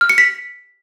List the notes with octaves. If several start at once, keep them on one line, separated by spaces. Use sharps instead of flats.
F6
C#7
B6